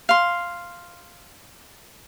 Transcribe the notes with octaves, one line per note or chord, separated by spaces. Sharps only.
F5 C6